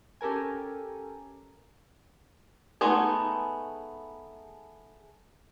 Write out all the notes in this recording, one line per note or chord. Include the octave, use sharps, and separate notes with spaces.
C#4 G4 A4 A#4 G#5
G#3 A3 B3 D#4